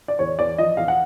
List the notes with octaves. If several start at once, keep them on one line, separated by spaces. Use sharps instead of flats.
D5
E2 C#5
E2 D5
F3 D#5
E2 F5
F#5